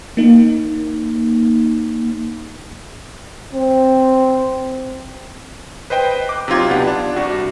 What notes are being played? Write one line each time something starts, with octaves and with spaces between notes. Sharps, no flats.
A#3 D#4
C4
B4 C5 D#5 G5
D6 F#6
C3 F#3 D#4 F4 G#6
B3 D4 G4 F#5
D4
C2 F#4